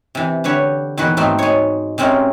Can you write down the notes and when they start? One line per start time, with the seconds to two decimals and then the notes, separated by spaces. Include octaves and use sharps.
0.15 C3 E3
0.44 D3 G4 B4 C#5
0.97 E2 A#2 D#3 F#4 B4
1.17 G#2 A3 C4 D#4
1.39 G#3 C#5
1.98 C3 G#3 C4 C#4 A#4